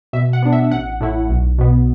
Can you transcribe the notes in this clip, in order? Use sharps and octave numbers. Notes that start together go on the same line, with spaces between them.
B2 E5
F#5
B3 D4
E5
A1 F#5
A2 A3 E4
B1
B2 B3